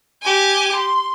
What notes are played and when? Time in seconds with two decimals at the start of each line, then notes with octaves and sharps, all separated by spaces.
0.22 G4 G#5
0.76 C6